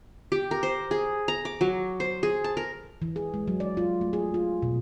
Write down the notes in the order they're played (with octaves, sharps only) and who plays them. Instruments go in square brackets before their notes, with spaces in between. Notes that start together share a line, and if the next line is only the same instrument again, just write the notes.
[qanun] G4
A#4
C5
G#4
A#5
D6
F#3
C5
G#4
A5
A#4
[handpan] E3
G#4
G#3
F#3
D5
F4
A3
G#4
F4
B2